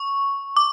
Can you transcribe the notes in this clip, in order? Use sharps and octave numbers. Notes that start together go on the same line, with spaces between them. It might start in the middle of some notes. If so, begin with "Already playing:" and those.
Already playing: C#6
D6